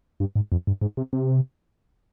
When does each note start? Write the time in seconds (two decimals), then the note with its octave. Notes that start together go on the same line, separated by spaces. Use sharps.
0.20 G2
0.36 G#2
0.52 F2
0.67 G2
0.81 G#2
0.97 C3
1.13 C3